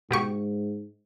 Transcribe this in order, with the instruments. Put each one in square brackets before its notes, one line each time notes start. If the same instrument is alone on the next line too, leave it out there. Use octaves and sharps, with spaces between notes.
[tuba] G#2 [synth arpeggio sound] B2 G4 C#6